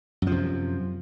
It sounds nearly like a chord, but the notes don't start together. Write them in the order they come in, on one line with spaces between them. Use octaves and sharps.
F#2 F3 C3